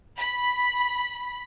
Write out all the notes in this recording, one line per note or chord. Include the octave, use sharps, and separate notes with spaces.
B5